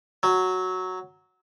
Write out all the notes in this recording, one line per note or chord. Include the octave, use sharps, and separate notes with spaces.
F#3